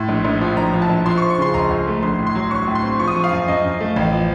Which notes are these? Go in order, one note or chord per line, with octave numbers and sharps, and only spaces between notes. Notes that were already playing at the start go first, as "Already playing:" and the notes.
Already playing: A2 C6
A#1
A#1
F3
A#1 A#5
F3
A5
A#1
F3 C6
C#6
F3
C#6
C#3 C6
C#2 A#5
C#2
A3
A#1 C6
A2
C6
F#3
F#3 C#6
A2
C6
C4
F3 C#6
D#6
F3 C#6
F5
F#2
F#2 D#5
F#2
A3
A1
F3